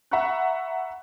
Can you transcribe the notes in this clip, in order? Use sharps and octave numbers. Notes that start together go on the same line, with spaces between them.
E5 F#5 A#5 B5 C#6 F#6